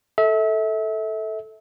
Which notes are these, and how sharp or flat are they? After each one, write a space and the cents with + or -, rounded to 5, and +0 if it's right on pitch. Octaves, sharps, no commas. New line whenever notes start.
A4 +0 E5 -30